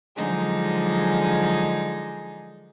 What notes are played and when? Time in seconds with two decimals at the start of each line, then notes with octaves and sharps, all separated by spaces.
0.16 D3 F3 F#3 G#3 D#4 G#4